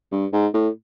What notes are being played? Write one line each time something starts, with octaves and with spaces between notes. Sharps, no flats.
G2
G#2
A2